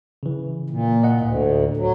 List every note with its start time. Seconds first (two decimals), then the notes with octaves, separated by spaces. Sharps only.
0.23 C#3 E3
0.70 A#2
1.03 D#5 F#5
1.21 D2 A2
1.77 F#3